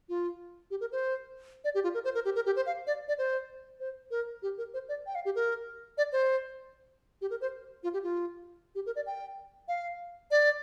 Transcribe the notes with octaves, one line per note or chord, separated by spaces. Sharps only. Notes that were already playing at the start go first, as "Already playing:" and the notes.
F4
G4
A#4
C5
D5
G4
F4
A#4
C5
A#4
G4
A#4
G4
C5
F5
D5
D5
C5
C5
A#4
G4
A#4
C5
D5
G5
F5
G4
A#4
D5
C5
G4
A#4
C5
F4
G4
F4
G4
A#4
D5
G5
F5
D5